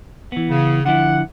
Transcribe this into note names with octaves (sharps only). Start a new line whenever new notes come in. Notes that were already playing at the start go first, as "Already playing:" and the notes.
E3 B3
C#3
D3 F3 E4 F#5